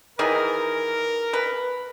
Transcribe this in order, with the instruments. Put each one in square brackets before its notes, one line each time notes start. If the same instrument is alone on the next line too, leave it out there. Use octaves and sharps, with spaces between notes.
[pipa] D#3 E3 G#4 [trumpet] A#4
[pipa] B4